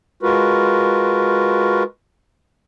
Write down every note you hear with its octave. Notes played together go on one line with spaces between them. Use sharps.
G#3 F4 F#4 A#4 B4